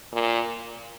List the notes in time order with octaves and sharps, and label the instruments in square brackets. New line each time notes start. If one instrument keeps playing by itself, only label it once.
[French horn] A#2